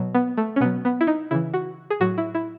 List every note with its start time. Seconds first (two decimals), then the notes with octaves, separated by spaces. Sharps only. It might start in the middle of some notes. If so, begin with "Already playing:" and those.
Already playing: B2 F#3
0.15 B3
0.37 A3
0.56 C#4
0.61 B2 F#3 B3
0.85 B3
1.01 E4
1.07 D#4
1.31 C#3 E3 E4
1.54 F#4
1.90 G#4
2.00 A2 F#3 F#4
2.18 E4
2.35 E4